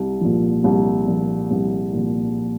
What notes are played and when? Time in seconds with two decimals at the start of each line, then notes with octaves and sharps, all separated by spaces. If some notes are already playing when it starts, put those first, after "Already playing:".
Already playing: C2
0.21 A#2 F3
0.64 C2
1.08 A#2 F3
1.51 C2
1.93 A#2 F3